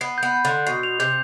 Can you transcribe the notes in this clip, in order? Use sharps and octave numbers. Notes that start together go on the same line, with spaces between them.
B3 C7
B3 G6
G6
D3
C6
B2 C7
F7
C3 G6